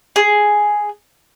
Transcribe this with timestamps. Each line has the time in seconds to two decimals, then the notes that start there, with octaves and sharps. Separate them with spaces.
0.16 G#4